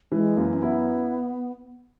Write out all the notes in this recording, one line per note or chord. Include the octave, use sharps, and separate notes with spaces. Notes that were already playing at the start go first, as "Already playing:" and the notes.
E3 G#3
F#2 A#3
C#4
B3 E4